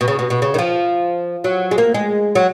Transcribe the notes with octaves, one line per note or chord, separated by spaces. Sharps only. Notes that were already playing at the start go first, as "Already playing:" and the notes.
B2
C#3
B2
B2
C#3
D#3
F3
F#3
G#3
A#3
G#3
F#3